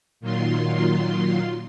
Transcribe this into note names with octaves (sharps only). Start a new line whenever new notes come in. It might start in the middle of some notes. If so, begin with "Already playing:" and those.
A#2 D#3 F#3 F4 C6